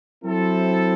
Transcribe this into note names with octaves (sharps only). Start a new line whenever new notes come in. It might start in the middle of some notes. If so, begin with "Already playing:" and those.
F#3 C4 E4 A4